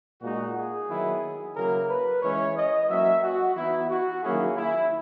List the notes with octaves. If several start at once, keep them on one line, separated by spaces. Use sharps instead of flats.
A#2 G#3 D#4 F#4
G#4
D#3 F#3 B3 E4
C#3 F#3 A#3 E4 A#4
B4
E3 G#3 C#4 E4 C#5
D#5
F#3 A#3 C#4 E5
F#4
E3 B3 D#4 E4
F#4
D#3 F#3 A#3 C#4 E4 G#4
E4